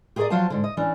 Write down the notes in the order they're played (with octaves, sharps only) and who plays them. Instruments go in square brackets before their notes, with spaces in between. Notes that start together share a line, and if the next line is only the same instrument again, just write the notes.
[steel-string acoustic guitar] G4 G#4 A#4 C5 D5 D#5
F3 F#3 F4 C5 F5 A5
G#2 D3
D#5
E3 C#4 D4